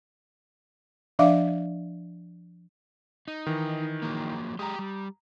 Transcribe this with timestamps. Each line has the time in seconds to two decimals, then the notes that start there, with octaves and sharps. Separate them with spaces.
1.19 F3 D4 D5 E5 F5 D6
3.28 D#4
3.47 D#3 E3
4.02 F3 F#3 A#3
4.59 G#3 G4 A#5 D#6
4.79 G3